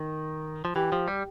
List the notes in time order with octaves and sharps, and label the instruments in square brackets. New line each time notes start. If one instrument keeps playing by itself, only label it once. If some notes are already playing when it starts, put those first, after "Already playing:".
Already playing: [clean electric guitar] D#3
F3
[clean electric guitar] E3 [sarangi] G4
[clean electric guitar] F3
G3